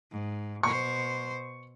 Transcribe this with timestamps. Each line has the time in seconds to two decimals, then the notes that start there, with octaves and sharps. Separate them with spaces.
0.11 G#2
0.63 B2 C5 C#6